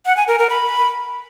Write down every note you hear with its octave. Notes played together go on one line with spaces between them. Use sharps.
F#5
G#5
A#4
A#4
B5